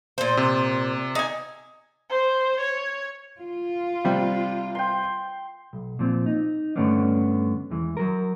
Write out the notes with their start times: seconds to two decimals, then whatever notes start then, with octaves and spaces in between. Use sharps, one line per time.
0.18 A#2 C5
0.37 C3
1.15 D#4 G#5
2.09 C5
2.60 C#5
3.41 F4
4.04 C3 G3 C4
4.75 G5 C6
5.73 B1
5.99 A#2 F3 C4
6.26 D#4
6.76 G2 D3 A3 B3 C#4 D4
7.71 E2 E3 G#3
7.97 F#3 A#4